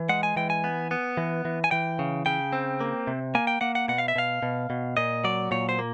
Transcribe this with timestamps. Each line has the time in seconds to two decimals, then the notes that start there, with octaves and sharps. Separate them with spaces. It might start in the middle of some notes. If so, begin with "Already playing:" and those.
Already playing: E3
0.09 G#3 F#5
0.23 G#5
0.36 E3 G5
0.50 G#5
0.64 B3
0.91 B3
1.17 E3
1.45 E3
1.64 G#5
1.71 E3 G5
1.99 C#3
2.26 C#3 G5
2.53 C4
2.81 A#3
3.07 C3
3.35 A#3 G#5
3.47 G5
3.61 A#3 F#5
3.75 F#5
3.88 B2 F#5
3.98 F5
4.08 E5
4.16 B2 F5
4.43 B2
4.70 B2
4.97 A#2 D#5
5.24 F#3 D5
5.51 A#2 C#5
5.69 C5
5.79 A#3